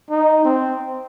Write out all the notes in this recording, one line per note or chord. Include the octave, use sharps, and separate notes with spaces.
D#4
C4